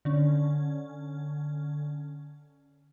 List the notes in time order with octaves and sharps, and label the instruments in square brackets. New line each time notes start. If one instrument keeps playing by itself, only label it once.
[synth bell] D3 C#4